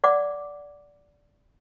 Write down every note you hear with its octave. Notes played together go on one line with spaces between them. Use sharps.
D5 F#5 D6